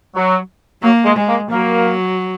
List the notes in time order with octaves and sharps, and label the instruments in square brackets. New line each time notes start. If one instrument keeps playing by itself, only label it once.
[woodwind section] F#3
[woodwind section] F#3 [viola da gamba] A#3
[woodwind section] G#3
[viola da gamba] G#3
[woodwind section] A#3
[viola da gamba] F#3 [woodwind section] A#3